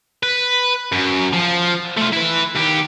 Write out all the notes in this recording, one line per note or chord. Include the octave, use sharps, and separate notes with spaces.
B4
F#2
F3
A3 F4
E4 B4
D#2 G4